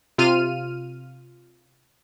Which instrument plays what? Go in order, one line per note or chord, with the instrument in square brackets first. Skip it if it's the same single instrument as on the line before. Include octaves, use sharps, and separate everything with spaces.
[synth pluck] C3 F4 F6 D#7